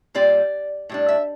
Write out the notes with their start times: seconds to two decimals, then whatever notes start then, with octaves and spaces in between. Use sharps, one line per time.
0.14 A#2 G3 C4 F4 D5
0.89 A2 G3 D4
1.08 E5